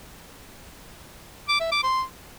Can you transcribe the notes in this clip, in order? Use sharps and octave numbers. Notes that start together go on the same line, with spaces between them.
D6
E5
D6
C6